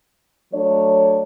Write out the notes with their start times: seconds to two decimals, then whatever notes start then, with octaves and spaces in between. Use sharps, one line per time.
0.53 F#3 A3 D4 C#5